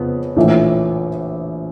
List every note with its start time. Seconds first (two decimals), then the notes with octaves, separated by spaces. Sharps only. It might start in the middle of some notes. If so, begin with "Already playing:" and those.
Already playing: F2 C#3 B3
0.36 A#1 A2 E3